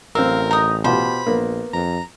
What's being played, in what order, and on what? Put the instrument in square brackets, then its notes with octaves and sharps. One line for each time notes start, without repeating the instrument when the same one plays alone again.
[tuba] A1 [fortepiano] C4 E6 [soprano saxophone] A#4 [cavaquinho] F5
[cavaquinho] D#4 D#6 [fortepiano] A#5
[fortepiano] B2 F4 G4 [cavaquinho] C5 [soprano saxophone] B5
[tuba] A#1 [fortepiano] A#3 B3
[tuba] F2 [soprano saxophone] A#5